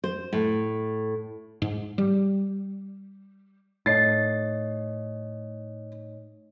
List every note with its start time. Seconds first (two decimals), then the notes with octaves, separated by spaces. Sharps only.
0.04 C5
0.33 A2
1.62 G#2
1.98 G3
3.86 A2 D#4 C#5 D#5 A6 C7